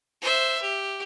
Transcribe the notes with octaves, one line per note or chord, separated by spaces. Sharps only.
C5 E5
G4